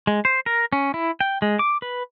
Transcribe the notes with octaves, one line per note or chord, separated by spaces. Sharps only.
G#3
C5
A#4
C#4
E4
G5
G#3
D6
B4